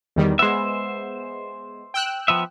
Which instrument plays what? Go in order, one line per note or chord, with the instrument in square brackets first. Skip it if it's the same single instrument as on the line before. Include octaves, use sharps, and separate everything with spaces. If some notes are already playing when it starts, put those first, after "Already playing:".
[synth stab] E2 D#3 G3
[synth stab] G#3 B3 [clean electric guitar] C5 E5
[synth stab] G5 E6 F#6
[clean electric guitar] F3 B3 E5